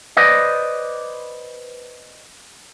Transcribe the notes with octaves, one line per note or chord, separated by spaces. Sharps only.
B4 C5 D5 D#5